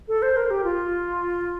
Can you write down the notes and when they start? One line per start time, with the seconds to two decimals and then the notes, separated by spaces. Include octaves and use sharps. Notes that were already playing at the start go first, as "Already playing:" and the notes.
0.08 A4
0.22 C5
0.37 A#4
0.50 G4
0.64 F4